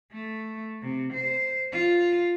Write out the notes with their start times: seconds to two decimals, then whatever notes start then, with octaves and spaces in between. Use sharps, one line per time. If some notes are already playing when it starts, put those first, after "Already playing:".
0.12 A3
0.82 C3
1.14 C5
1.72 F4